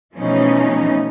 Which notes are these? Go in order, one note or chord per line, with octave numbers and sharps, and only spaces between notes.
B2 E3 F3 A3 C#4 D#4